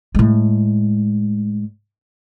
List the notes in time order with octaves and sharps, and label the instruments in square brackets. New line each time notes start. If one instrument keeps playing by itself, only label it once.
[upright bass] A2 G#3